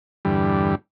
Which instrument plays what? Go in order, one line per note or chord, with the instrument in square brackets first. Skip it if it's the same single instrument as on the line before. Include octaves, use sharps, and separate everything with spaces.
[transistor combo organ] E2 G2 D3 G3